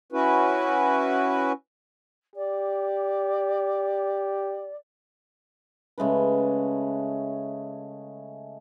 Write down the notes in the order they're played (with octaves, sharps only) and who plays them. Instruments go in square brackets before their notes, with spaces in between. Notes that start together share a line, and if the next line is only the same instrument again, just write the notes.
[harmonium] C#4 E4 F#4 B4
[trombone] G4 [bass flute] D5
[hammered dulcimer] C#3 G#3 A3 B4